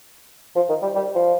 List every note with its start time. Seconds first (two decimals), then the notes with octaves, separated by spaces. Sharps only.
0.56 F3
0.69 D#3
0.82 G3
0.95 G3
1.16 F3